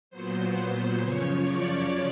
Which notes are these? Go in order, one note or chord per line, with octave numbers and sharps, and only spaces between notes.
A#2 F#3 B3 C5
F#2 C#3 F3 C#5
D5